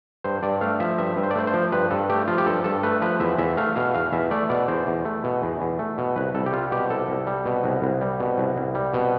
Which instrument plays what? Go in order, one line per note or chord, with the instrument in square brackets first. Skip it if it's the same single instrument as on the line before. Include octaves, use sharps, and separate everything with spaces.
[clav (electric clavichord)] G2 C5
G2 D5
A3 F5
F3 E5
G2 E5
G2
C5
D5
A3 C5
C5
F3
G2 B4
G2 A4
A3 G4
F3 F4
G4
G2 A4
G2 A4
A3 B4
F3 B4
E2 E5
E2 E5
A3 F5
B2 F5
E2 F5
E2 E5
A3 D5
B2 D5
E2 C5
E2
A3
B2
E2
E2
A3
B2
C2 B4
C2 A4
G4
G3 F4
B2 G4
C2 A4
C2
G3
B2
C2
C2
G3
B2
C2
C2
G3
B2